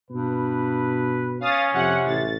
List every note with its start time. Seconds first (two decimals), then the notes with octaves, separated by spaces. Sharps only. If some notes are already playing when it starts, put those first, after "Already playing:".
0.11 G2 B2 B4
1.41 C#4 F5 D#6 A6
1.74 F2 C3 F#5
2.06 A1 A6